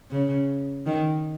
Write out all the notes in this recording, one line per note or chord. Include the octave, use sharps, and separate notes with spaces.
C#3
D#3